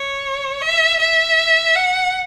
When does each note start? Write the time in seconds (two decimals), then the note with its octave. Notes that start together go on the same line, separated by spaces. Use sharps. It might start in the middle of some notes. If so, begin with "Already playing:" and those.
Already playing: C#5
0.61 E5
0.99 E5
1.76 F#5